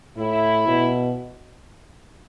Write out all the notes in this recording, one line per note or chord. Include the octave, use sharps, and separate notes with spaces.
A2 E4
B2